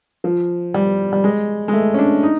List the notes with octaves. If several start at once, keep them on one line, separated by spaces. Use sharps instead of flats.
F3
G3
G3
G#3
G#3
A3
C#4
D4
D#4